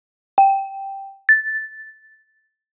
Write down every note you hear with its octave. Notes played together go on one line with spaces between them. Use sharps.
G5
A6